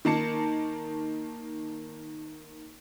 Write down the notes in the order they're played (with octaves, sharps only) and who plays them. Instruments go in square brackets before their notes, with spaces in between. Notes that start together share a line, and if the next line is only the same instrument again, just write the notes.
[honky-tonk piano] D#3 A#3 A5 C#7